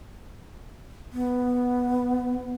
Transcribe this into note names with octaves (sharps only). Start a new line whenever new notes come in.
B3